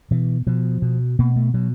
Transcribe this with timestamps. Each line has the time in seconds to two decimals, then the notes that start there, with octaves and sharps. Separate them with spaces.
0.11 B2 E3
0.47 B2 F3
0.82 B2
1.19 B2 A#3
1.36 A3
1.54 B2 F#3